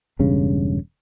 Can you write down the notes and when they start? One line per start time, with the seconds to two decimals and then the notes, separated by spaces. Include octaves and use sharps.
0.19 E1 G2 C#3